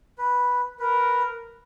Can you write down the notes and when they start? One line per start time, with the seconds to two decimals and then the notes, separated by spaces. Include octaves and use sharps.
0.18 B4
0.79 A#4 B4